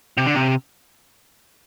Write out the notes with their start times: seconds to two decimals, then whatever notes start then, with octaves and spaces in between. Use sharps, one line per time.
0.17 C3
0.26 D3
0.35 C3